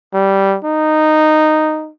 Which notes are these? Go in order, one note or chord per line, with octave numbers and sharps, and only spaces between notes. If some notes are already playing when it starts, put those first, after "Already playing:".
G3
D#4